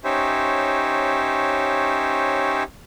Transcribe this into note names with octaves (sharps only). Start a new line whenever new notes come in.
C#4 D#4 G4 C5 C#5 E5